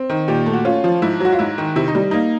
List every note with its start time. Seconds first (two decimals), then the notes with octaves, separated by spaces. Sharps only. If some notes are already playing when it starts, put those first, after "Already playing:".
Already playing: C4
0.10 D#3
0.28 A#2 G4
0.46 A3
0.54 F#4
0.65 C#4 F4
0.84 F3
1.02 G#2 E4
1.20 F#3 F#4
1.32 F4
1.39 G#2 E4
1.58 D#3
1.76 C3 E4
1.88 D#4
1.95 G3
2.11 A#3 D#4